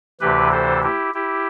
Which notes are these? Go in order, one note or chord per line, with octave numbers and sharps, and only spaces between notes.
D2 C3 E3 G4 B4
A4 C5
E4 G4
E4 G4